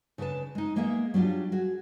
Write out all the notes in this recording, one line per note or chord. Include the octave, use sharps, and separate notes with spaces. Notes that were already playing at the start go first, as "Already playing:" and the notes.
C#3 D4 G#4 B4 A5
G#3 D#4
G#3 A#3 B3 G#4 E5
F#3 G3 D4 F4
F#4 G#4